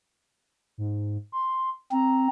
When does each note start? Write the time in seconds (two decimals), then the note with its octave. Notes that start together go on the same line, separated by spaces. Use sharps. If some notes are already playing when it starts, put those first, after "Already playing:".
0.78 G#2
1.32 C6
1.92 C4 A#5